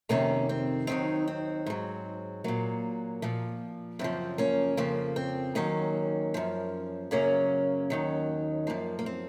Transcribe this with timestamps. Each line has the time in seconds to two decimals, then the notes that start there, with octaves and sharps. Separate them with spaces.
0.09 F2 C3 D#3 A#3 C#4
0.49 C4
0.87 D#2 D#3 F#3 C4 D#4
1.27 C4
1.66 G#2 F#3
2.44 A#2 F#3 A#3
3.22 A#2 F3
3.99 F#2 C#3 F3 C4
4.38 A#3 C#4
4.77 F2 C#3 F3 A#3
5.16 C4
5.55 D#2 D#3 F#3 A#3 C#4
6.34 F#2 F3
7.11 F#2 C#3 F#3 A#3 C#4
7.90 D#2 D#3 F#3
8.67 F#2 F3 A#3
8.99 A#3
9.06 C4